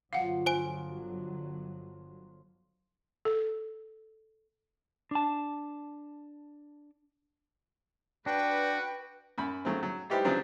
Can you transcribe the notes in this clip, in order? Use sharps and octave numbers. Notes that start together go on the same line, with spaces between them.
G1 D3 F3 F#3 F5 F#5
F4 C5 G#5 D7
A4
D4 A5
D4 F#4 B4 G5
F#2 B5
C#3 F#3 A3 C4
F#3
G3 D#4 E4 G4 B4 C5
C#3 F3 F#3 B3 C4 D4